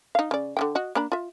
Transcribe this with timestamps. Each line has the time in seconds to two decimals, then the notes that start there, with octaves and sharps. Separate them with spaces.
0.15 D#4 F5
0.31 C#3 D5
0.57 D3 E3 G5
0.75 F#4 D#5
0.95 A#3 D4 B5
1.12 F4 E5